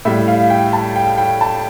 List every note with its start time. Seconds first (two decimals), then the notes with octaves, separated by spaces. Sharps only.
0.05 A2 G3 E5
0.28 F5
0.50 G5
0.73 A5
0.96 G5
1.18 G5
1.41 A5